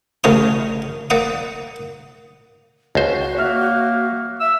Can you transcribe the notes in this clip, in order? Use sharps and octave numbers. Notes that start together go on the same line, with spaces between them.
A1 C#3 A#4 C#5 D#6
A#3 D5 F#5 D#6
C#2 F#4 C5
A#3 C#5 E5 F6
E5 E6